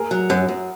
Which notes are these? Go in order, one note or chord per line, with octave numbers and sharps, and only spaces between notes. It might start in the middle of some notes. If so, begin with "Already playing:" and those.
Already playing: G#4 A#4
F#3
F#2
F#2